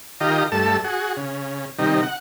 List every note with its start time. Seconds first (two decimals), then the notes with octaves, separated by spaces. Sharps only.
0.20 D#3 F4 G4 D#5 A#5
0.52 G2 A3 A4 E6
0.84 F#4 G#4
1.17 C#3
1.79 C3 D#3 G3 D#4
2.03 F#5